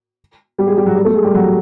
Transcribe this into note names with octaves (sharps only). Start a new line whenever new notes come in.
G3 G4
G#3 G#4
G3 G4
F#3 F#4
G3 G4
A3 A4
G#3 G#4
G3 G4
F#3 F#4